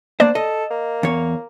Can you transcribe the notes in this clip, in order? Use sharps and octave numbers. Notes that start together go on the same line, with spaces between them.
A#3 D4 C5 D5
A4 D#5
A#3
E2 C#5